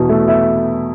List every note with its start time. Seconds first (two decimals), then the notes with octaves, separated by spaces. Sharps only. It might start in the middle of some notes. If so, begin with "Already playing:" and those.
Already playing: E2 B2
0.09 A3
0.28 E4